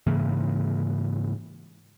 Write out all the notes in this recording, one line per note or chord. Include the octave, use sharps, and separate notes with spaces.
G#2 C#3 E3 A#3